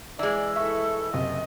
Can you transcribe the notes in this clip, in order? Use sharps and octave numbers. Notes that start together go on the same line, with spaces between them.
E3 G#3 D5 E6
E4 A4 E5 C#6
F#1 C3 D#5